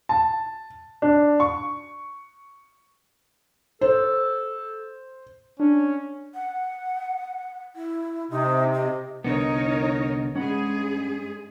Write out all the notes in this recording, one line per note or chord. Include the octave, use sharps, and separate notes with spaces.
A5
D4
C#6
A4 C5
C#4 D4
F#5
E4
C3 D#4
D#5
C2 D3 B3 D#4 A#4 C#5
G2 G#3 C#4 G#4 F#5 B5